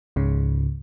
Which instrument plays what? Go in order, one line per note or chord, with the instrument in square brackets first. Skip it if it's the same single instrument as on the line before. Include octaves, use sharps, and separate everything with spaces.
[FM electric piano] C#2 G#2 C#3